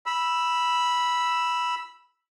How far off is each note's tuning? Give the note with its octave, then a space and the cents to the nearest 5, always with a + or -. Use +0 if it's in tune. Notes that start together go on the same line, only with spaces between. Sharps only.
B5 -10 E6 +5